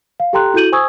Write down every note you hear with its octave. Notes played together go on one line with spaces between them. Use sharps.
F5
G4 A4 G5 A#5 C6 F#6
E4 F#4 A4 G6 D#7 F#7
C5 G#5 C#6 D#6 E6 G#6